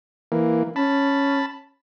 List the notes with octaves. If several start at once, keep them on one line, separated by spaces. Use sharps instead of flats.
E3 A#3
C#4 A5 B5